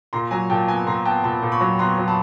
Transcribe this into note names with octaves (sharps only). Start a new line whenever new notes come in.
A#2 A#5 C6
F#3 G#5 A#5
A#2 G5 A5
B3 G#5 A#5
A#2 A#5 C6
B3 G5 A5
A#2 A5 B5
A#2
B5 C#6
F#3
B3 A#5 C6
F#3
A5 B5